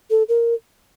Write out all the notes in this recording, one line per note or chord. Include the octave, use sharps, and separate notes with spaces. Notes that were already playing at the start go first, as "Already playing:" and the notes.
A4
A#4